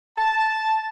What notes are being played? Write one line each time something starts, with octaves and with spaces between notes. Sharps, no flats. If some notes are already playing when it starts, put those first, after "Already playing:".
A5